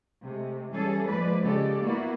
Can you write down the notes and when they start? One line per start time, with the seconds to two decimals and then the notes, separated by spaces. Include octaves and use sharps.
0.23 C3 G#3 A3
0.73 E3 G3 C#4 G#4 A4
1.06 F3 G#3 A#3 B4 D5
1.42 C#3 G#3 G4 A4 D5
1.84 A#3 B3 E4 F#4